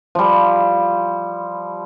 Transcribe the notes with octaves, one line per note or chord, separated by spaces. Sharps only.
F3 G3